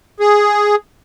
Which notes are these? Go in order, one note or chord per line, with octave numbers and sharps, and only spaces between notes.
G#4